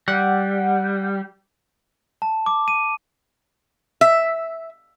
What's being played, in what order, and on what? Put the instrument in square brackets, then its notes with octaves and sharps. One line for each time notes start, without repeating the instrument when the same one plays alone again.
[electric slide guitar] G3 [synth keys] F#5
[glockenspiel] A5
D6
D#7
[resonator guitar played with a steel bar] E5